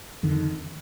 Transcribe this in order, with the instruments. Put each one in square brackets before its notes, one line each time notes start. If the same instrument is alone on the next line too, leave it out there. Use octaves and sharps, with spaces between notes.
[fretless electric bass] F2 D3 D#3